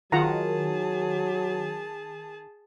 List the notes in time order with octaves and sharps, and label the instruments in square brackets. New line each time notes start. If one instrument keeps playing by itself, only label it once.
[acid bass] D#3 [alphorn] F#3 [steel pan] F4 F#5 A#5 [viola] G#4 A5